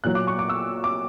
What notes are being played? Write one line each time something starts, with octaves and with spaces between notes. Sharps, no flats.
A#2 F#3 F#6
D6
C#6
D6
E6
D6